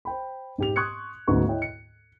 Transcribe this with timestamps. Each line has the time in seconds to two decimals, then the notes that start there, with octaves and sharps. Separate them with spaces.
0.05 C5 G5 B5
0.58 G#2 G4 F7
0.76 C6 C#6 D#6 F#6 G#6 C#7
1.27 D2 G#2 C#3 B3 F#4 C#6
1.48 E4 C#5 D#5 G5
1.62 C#7